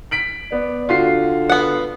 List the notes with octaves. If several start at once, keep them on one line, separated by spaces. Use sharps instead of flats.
B6 D7 F#7
B3 D5
D3 F4 F#4 C7
B3 F#5